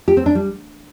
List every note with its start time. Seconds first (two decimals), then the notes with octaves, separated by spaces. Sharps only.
0.08 G4
0.17 C4
0.26 D4
0.35 G3